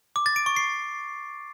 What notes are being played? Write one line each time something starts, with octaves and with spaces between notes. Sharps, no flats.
D6
A6
D7
C#6
C7